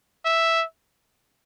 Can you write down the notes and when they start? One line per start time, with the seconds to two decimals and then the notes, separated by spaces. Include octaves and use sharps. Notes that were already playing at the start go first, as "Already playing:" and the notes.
0.25 E5